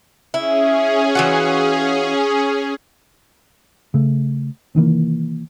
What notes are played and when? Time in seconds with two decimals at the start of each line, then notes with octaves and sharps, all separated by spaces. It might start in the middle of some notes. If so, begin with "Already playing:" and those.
0.34 C#4 E4 G#4
1.15 E3 F4 F#4
3.94 C#3 A3
4.75 C3 D#3 E3 A#3